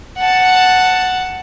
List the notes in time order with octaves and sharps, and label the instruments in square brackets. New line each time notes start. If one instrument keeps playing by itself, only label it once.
[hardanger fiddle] F#5 A5